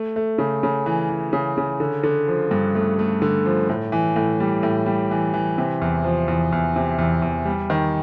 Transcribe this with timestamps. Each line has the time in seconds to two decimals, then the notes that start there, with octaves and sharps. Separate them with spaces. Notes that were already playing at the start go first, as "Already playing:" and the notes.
Already playing: A3
0.16 A3
0.38 C#3
0.63 C#3
0.86 E3
1.09 E3
1.33 C#3
1.57 C#3
1.80 D3
2.03 D3
2.28 F3
2.51 G2
2.75 A3
2.99 A3
3.22 D3
3.46 F3
3.69 A2
3.92 E3
4.16 A2
4.40 G3
4.63 A2
4.86 G3
5.11 E3
5.34 E3
5.58 C3
5.82 E2
6.04 F3
6.28 E2
6.52 E2
6.76 C3
6.99 E2
7.22 E2
7.45 G3
7.70 D#3